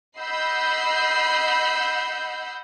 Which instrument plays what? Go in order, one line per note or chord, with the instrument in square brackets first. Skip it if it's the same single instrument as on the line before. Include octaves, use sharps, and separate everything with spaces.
[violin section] D#5 F#5 B5 E6 G6 C7